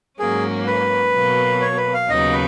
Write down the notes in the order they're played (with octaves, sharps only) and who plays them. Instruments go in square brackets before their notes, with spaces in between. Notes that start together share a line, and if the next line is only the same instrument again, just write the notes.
[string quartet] G#2 F#3 A#3 C#4 [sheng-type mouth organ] G#4
[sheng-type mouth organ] B4
[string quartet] B2 F#3 A#3
[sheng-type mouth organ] C#5
B4
F5
[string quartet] D#2 C#3 F#3 B3 D#4 [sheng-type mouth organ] D#5
[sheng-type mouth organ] B4